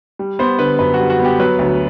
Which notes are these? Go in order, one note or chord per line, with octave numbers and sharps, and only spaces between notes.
G3
B3 C5
D3 B4
F#2 B4
F#4
G3
F#4
B3
G4
F#3 B4
D2